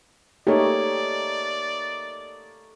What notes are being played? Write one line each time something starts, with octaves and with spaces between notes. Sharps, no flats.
A3 A#3 D#4 G4 C#5 D5